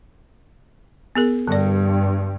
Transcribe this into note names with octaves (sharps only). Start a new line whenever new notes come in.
B3 G#4 A#4
G2 D3 D5